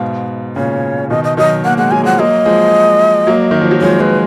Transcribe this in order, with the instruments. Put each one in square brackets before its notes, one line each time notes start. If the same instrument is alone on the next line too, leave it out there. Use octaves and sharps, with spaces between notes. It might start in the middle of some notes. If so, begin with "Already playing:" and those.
Already playing: [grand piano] G#2 B2 [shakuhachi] F5
[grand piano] A#2 C#3 [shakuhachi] C#5
[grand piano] B2 D#3 [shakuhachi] D#5
[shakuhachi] D#5
[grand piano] D#3 F#3 [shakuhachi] D#5
[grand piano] A#3 [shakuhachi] F#5
[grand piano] G#3 [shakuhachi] F#5
[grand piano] F#3 [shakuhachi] G#5
[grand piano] F3 G#3 [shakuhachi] F#5
[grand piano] F#3 A#3 [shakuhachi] D#5
[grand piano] F3 G#3
F#3 A#3
D#3
F3
F#3
[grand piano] F3 G#3 [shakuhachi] C#5
[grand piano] F3 G#3 [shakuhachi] B4